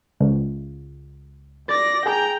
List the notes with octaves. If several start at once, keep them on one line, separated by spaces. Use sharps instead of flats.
C#2
D5 A6 A#6
G#4 G5 G#5 A#5